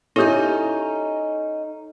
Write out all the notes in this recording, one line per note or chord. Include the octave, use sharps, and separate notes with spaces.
C#4 D#4 E4 G4 A4 E5 G6